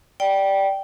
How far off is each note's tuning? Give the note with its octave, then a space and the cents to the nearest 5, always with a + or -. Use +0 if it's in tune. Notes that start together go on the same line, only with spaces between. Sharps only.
D5 +0 G5 -10